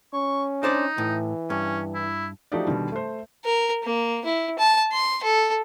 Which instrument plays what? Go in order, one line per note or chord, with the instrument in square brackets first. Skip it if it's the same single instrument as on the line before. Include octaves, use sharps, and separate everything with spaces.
[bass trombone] C#4 [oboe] C#6
[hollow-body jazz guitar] D4 C5 D5 [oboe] D#4
[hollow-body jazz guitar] A2 [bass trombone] E3
[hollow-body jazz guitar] G2 [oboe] C#4
[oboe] E4
[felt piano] F3 A3 D#4 F#4 G4 D5
B2 D3 D#3 G3
A3 C5
[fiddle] A#4
A#3
E4
A5
C6
A4